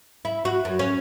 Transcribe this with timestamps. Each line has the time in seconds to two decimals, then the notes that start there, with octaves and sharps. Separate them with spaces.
0.25 E4
0.45 F#4
0.65 F#2
0.79 C#4